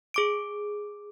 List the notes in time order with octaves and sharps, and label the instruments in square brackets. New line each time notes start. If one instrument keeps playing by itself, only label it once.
[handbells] G#4 D6 D7